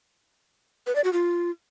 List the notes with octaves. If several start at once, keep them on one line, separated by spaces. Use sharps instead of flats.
B4
D5
F#4
F4